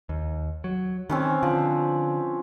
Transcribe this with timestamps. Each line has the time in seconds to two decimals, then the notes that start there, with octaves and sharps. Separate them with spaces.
0.09 D#2
0.64 F#3
1.10 D#3 C4 C#4 B4
1.43 D3 F3